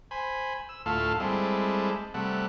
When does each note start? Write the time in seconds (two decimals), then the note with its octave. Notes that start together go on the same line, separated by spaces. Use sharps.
0.11 C5 G#5 B5
0.69 E6
0.86 D2 A2 A3 F4 A4 F5
1.20 G3 G#3 C4 E4 A4
2.14 C3 G3 A3 F#5